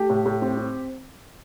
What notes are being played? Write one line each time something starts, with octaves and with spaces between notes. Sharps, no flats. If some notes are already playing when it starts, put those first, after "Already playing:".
Already playing: A3 G4
A2
A2
C4
C4